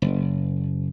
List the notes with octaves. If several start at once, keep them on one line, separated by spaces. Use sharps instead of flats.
F#1